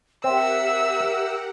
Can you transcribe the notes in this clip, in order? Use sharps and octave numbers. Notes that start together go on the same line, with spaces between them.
C4 G4 A#4 E5 F#5 E6